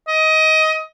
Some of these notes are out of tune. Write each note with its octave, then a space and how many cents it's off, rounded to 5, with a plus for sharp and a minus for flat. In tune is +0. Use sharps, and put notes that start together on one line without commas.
D#5 +20